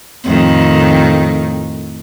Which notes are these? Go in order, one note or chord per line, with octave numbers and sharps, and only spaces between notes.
F2 A2 D#3